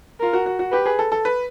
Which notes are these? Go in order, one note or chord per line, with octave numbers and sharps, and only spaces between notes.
F4 A#4
F#4
F#4
F#4
G4 B4
G#4
A4
A4
B4